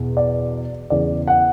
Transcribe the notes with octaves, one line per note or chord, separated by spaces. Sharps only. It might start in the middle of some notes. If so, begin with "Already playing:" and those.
Already playing: E2 B2
D5
E2 C#3 E3 D5
F#5